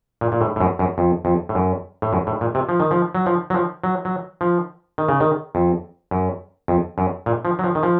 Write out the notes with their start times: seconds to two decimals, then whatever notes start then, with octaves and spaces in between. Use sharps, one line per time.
0.21 A#2
0.32 A#2
0.41 A2
0.56 A2
0.60 F#2
0.79 F#2
0.98 F2
1.25 F2
1.49 A2
1.55 F#2
2.02 A2
2.13 F#2
2.27 A2
2.41 A#2
2.55 C3
2.69 F3
2.80 D#3
2.91 F3
3.15 F#3
3.26 F3
3.50 F#3
3.54 F3
3.84 F#3
4.05 F#3
4.41 F3
4.98 D#3
5.09 C#3
5.20 D#3
5.55 F2
6.11 F#2
6.68 F2
6.98 F#2
7.26 A#2
7.45 F3
7.59 F#3
7.64 F3
7.75 D#3
7.83 F3